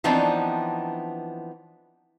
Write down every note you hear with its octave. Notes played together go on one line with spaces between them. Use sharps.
E3 F3 B3 C4 D4 D#4